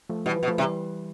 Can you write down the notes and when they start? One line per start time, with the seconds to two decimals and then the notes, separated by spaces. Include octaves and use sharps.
0.09 F3 A3
0.26 B2 E3 G3
0.37 F3
0.43 B2
0.48 F3 A3
0.58 C3 E3 G3